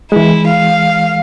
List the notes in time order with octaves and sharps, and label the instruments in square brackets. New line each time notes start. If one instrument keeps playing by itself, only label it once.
[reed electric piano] E3 G#3 [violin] E4
[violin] F5